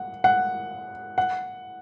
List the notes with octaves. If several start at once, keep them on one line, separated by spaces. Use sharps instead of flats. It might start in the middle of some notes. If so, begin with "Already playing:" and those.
Already playing: F#5
F#5
F#5